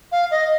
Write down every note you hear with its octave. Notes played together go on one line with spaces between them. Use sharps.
F5
D#5